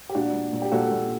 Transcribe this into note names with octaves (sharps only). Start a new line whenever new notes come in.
G4
A#2 D4 F#4
A#2
A#2
G4
A#2 F#4 A4
A#2